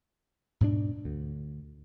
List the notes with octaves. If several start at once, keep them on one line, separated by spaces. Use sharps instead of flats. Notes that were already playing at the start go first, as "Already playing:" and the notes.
G#2 B2 B3 D4
D2